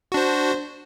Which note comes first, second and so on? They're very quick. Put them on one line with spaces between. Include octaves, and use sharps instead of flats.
F#4 D4 C5